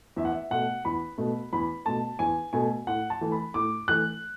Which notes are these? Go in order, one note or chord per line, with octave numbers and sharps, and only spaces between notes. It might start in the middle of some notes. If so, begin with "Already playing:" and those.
E2 E5
F#5
E5
B2 A3 F#5
E2 B5
B2 A3
E2 B5
B2 A3 A5
E2 G#5
B2 A3 G#5
A2 F#5
A5
E3 A3
B5
A2 D6
E3 A3 F#6